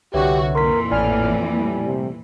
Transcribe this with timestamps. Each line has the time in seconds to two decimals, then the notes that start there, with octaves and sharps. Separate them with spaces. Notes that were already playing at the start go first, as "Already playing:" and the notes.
0.14 C2 D3 F#4 G4 B4 C#5 E5
0.55 F2 A#2 E3 A#4 C6 B6
0.91 A1 A2 E4 D5 G#5 F6
1.54 A2 G3
1.86 C3